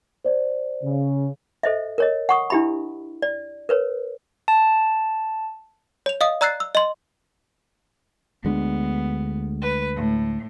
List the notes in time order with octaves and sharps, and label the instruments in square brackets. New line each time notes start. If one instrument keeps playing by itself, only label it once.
[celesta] C5 D5
[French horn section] C#3
[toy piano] A4 C5 D#5 E5
A#4 C#5 D#5
F#5 C#6 D#6
D4 E4 G4 E5 B5
D5
A#4 B4 C#5
[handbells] A5
[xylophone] C#5 F7
D#5 F5 D#6
D5 A#5 E6 F#6 A6 C7
E6
D#5 C6
[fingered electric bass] D2 G#3 D4 [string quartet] B3
[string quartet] B4
A2